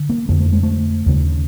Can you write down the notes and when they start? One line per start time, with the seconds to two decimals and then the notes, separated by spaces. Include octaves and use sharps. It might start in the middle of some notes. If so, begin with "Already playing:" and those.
Already playing: D3
0.09 A#3
0.29 F2 D3 A#3
0.40 A3
0.52 G#3
0.63 A3
1.06 D#2 C#3